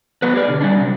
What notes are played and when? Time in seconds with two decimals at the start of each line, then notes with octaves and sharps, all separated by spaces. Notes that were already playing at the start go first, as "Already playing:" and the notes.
0.22 F#3 B3 B4
0.34 G4 G#4 D5
0.48 B2 D3
0.61 F#3 G3 C#4 D4
0.81 C3 G3